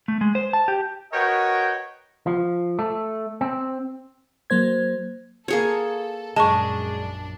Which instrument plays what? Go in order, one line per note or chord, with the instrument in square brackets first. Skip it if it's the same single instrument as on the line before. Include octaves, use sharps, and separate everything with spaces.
[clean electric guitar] A3
G#3
C5
A5
G4
[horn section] F#4 A#4 B4 C#5 D#5 G5
[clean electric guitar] F3
A3
C4
[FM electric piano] F#3 A#3 C5 G#6
[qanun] A#3 G#4 C#5 [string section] A4
[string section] A#1 F#2 D4 [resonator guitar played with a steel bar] G#3 [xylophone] A5 C#6